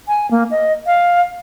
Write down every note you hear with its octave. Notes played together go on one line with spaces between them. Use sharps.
G#5
A#3
D#5
F5